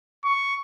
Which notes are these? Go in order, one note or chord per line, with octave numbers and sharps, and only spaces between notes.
C#6